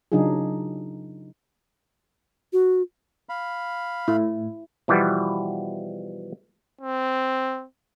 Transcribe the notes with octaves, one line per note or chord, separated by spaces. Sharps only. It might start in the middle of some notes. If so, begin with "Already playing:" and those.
C#3 F#3 D4 D#4 F4 G#4
F#4
F5 B5
A2 E4
B2 E3 F3 G3 B3
C4